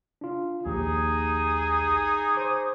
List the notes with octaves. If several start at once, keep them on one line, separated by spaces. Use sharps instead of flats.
D4 F4
A#1 D#2 D#4 G4 G#4 D#6
C5 D6